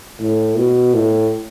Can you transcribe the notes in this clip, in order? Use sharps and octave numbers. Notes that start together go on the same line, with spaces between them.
A2
B2
A2